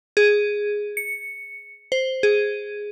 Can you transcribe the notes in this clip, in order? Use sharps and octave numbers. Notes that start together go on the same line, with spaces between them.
G#4
C#7
C5
G#4